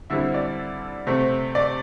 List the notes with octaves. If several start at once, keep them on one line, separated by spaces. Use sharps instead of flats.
D3 G3 C4 E4
D5
C3 A3 C4
D5